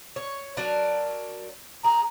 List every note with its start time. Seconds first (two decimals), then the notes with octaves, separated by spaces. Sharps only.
0.16 C#5
0.57 F#3 D4 A#4
1.84 G#4 A#5